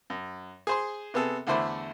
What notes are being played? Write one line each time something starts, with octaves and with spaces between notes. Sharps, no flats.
F#2
G#4 C5 C6
C3 B3 G#4 A4
E2 D3 A3 E4 C5 B5